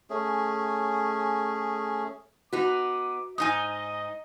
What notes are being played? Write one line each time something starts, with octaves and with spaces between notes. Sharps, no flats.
A3 C#4 G#4
B3 D#4 F#4 D6
G#2 D#4 D#5 G#5 D#6